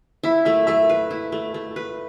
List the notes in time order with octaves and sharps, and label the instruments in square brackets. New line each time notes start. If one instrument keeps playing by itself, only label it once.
[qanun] E4 [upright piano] E5
[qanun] A3 [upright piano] E5
[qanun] A3 [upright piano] E5
[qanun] B4
E4
A3
A3
B4